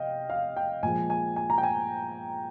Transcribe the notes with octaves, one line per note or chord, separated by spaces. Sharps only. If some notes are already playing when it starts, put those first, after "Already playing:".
Already playing: C3 D#5 F5 G5
F5
G5
A#2 F3 G#3 G#5
G#5
G#5
A#5
G5
G#5